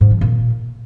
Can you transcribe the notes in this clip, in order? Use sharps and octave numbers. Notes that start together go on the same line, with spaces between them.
G#2
F3
A#2